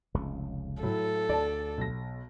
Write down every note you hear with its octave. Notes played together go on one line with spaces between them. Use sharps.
F1 C#2 C#3
A2 F#3 A4
D2 D5 A5
B1 A#6